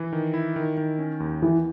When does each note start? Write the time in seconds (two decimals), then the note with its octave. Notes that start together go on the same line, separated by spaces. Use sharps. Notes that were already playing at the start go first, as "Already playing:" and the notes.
Already playing: E3
0.13 D#3
0.34 E4
0.56 D#3
0.77 D#3
0.99 C#4
1.20 D#2
1.42 E3 B3